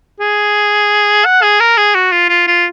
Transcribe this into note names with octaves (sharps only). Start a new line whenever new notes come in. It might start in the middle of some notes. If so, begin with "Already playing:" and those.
G#4
F#5
G#4
A#4
G#4
F#4
F4
F4
F4